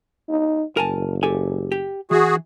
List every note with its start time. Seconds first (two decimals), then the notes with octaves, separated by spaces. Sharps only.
0.29 D#4
0.77 F#1 A#4 G#5 A5
1.23 G4 A4 G#5
1.72 G4
2.11 E3 F#4 G#4